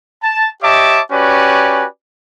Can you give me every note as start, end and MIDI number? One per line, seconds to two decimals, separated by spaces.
0.23 0.50 81
0.63 1.01 67
0.63 1.01 73
0.63 1.01 75
0.63 1.01 76
0.63 1.01 81
0.63 1.01 86
1.12 1.86 61
1.12 1.86 66
1.12 1.86 67
1.12 1.86 71
1.12 1.86 74
1.12 1.86 80